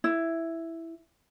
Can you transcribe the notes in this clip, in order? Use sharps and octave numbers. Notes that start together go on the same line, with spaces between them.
E4